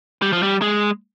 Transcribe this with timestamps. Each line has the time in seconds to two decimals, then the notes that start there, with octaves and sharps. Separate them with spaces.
0.22 G3
0.33 F3
0.43 G3
0.62 G#3